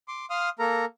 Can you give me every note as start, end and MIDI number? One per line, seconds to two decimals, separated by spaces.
0.08 0.26 84
0.08 0.26 86
0.30 0.49 77
0.30 0.49 84
0.30 0.49 87
0.30 0.49 89
0.59 0.85 58
0.59 0.85 69
0.59 0.85 70
0.59 0.85 82